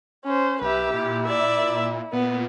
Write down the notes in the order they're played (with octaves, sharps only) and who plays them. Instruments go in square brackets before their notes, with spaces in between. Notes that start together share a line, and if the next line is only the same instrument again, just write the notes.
[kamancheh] C#4 C5
[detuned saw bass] B1 [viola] G4 [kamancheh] B4 E5
[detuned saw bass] A#2 [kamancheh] E4
[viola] D5 E5
[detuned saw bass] A#2 [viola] B3